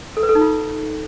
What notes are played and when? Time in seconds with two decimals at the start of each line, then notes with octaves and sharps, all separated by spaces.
0.17 A4
0.23 B4
0.29 A4
0.35 D#4
0.41 F4